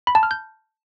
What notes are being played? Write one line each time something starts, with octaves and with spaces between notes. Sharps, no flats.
B5
A5
F6
G6